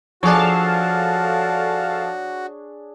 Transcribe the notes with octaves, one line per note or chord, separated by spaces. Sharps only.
F3 D4 F#4 G#4 A4 C#5 F5 A5